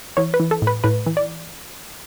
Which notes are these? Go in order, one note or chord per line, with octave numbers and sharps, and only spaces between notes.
E3 C#5
B4
E3
A4
A2
B4
A2 B4
E3
D5